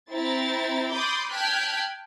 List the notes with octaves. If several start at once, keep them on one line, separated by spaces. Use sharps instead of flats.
C4 E4 A#5 A6
B5 C6 D6 D#6 G6 A6
G5 A5 F6 F#6 G#6 B6